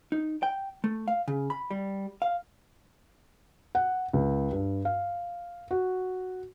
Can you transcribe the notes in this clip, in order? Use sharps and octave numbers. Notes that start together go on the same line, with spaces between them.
D#4
G5
A3
F5
C#3
B5
G3
F5
F#5
C#2
G2
F5
F#4